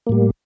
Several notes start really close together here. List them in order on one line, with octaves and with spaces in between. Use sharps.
A#3 A2 G3